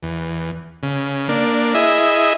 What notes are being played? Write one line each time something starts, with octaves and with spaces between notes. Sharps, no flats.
E2
C#3
A#3 D4
E4 G#4 D#5 E5